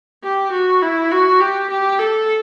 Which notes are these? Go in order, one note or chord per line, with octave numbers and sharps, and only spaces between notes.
G4
F#4
E4
F#4
G4
G4
A4